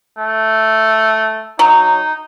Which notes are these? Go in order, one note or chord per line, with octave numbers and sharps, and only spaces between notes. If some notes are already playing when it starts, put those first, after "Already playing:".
A3
F#3 D#4